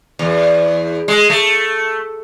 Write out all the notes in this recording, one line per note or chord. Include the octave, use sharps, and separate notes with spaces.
E2
G#3
A3